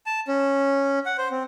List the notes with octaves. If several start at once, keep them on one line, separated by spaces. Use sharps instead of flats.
A5
C#4
F#5
C5
C4